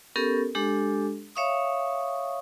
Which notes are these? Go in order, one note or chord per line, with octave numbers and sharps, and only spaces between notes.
B3 C#4 G4 A4 A#4
G#3 D4 G4 A4
C#5 E5 F5 C#6 D#6